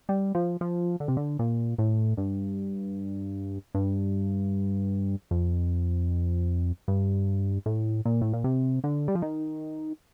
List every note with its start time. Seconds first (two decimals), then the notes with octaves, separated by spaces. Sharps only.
0.09 G3
0.35 F3
0.61 F3
1.00 D3
1.08 C3
1.17 D3
1.39 A#2
1.78 A2
2.17 G2
3.75 G2
5.31 F2
6.88 G2
7.66 A2
8.05 A#2
8.22 A2
8.33 A#2
8.44 C3
8.84 D3
9.08 G3
9.15 F3
9.22 D#3